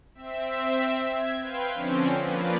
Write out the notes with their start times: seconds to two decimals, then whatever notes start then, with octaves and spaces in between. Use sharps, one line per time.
0.15 C4 E5
1.09 G#6
1.41 B4 F5 G5 C6
1.73 D3 F3 C4 C#4
2.24 F3 A#3 B4 D5